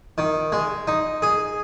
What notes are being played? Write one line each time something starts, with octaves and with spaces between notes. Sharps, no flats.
D#3
G#3
D#4
G#4